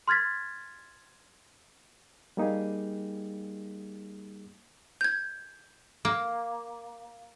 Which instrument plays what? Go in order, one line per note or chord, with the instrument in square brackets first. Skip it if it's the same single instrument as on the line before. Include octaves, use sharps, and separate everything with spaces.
[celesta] C6 F6 G#6 A6 B6
[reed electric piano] G3 A#3 D#4 G4 G#4
[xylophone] G6 G#6
[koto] A#3